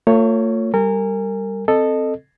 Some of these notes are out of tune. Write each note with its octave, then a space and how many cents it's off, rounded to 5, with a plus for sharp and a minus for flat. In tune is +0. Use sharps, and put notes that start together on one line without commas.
A3 +45 F4 +20 C#5 +0
G3 +0 A#4 -30 G#5 -25
C4 +0 A4 +0 D#5 -20